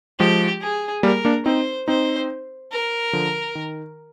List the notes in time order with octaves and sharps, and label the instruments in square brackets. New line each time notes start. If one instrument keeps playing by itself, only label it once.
[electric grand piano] F3 G#3 [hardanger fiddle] G4
[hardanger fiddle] G#4
[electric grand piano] G3 A#3 [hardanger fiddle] A#4
[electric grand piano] A#3 D4
[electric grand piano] C4 D#4 [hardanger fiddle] C5
[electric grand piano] C4 D#4 [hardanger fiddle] C5
[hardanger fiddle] A#4
[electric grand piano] D3 F3
D#3